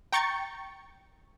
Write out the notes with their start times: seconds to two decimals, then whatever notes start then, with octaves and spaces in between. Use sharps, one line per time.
0.13 G5 A#5 C#6 G6 A6 C#7